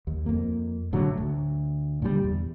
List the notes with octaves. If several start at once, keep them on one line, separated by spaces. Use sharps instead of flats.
D#2
F2 A#3
A2 D3 F#3
D2
A#2 D3 F3 G3
E2